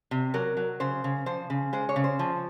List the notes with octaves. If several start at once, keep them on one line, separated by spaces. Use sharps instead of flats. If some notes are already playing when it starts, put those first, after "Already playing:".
C3
F#3 A#4
F#3
C#3 C5
C#3
F3 C5
C#3
G#3 C5
C#5
C#3
C5
F3